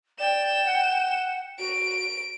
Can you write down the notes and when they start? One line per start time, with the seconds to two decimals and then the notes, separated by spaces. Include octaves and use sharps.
0.20 D5 G5 E7
0.66 F#5
1.59 F#4 D7